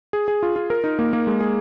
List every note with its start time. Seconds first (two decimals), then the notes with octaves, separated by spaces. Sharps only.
0.13 G#4
0.28 G#4
0.43 F4
0.56 F4
0.70 A#4
0.84 D#4
0.99 A#3
1.13 A#3
1.27 G#3
1.40 G#4